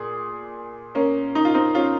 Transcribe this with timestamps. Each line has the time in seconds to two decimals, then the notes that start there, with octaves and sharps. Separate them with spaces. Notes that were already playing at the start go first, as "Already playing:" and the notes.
Already playing: A#2 G#4
0.95 A#3 C#4
1.35 D#4
1.45 F4
1.54 C4 D#4
1.74 C#4 F4